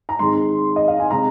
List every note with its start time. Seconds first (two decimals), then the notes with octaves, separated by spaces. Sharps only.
0.09 A#5
0.19 G#2 D#3 G#3 C4 C6
0.76 D#5
0.88 F5
1.00 G#5
1.11 C3 G#3 C4 A#5